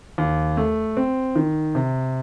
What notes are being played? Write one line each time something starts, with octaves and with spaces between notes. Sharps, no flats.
D#2
A3
C4
D#3
C3